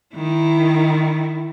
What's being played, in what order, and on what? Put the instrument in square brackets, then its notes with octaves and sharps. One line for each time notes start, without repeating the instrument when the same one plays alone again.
[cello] D#3 E4